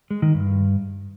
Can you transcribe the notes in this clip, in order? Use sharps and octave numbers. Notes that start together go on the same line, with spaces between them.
G#3
D#3
G2